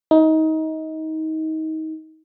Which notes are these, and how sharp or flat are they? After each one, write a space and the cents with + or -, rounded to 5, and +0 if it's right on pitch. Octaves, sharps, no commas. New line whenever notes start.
D#4 +25